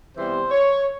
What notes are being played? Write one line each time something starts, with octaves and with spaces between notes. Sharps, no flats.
C3 E3 G3 B3 C5
C#5